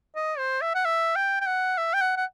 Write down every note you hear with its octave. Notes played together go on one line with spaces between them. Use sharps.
D#5
C5
E5
F#5
E5
G5
G5
F#5
E5
G5
F#5
F#5